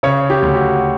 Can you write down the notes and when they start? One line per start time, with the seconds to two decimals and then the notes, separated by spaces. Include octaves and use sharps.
0.03 C#3 C#5
0.30 G4
0.42 D2
0.54 F#4